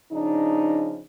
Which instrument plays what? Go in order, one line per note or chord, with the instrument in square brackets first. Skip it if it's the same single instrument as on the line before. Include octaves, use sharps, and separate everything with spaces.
[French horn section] C#3 F3 D4 D#4